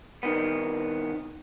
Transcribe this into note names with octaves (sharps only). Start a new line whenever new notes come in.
C2 D#3 B3